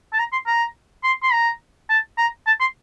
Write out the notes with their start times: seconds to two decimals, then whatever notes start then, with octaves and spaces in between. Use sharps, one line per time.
0.13 A5
0.19 A#5
0.32 C6
0.47 A#5
1.03 C6
1.23 C6
1.32 A#5
1.89 A5
2.18 A#5
2.47 A5
2.61 C6